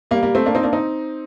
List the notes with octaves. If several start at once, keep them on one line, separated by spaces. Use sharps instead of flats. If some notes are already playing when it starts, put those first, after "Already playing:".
G3 A#3
G3 A#3
A3 C4
A#3 D4
C4 D#4
A#3 D4
C4 D#4